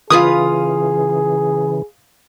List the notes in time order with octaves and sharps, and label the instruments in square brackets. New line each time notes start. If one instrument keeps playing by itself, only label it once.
[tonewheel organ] C#3 E3 [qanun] F4 B4 G#5 [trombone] G#4 [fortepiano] F5 D#6